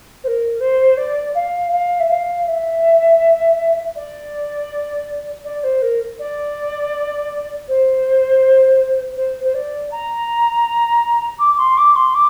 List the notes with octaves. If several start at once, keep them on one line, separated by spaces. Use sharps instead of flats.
C5
A#4
C5
D5
F5
F5
E5
F5
E5
D5
D5
C5
A#4
D5
C5
C5
C5
D5
A#5
D6
C6
D6
C6
D6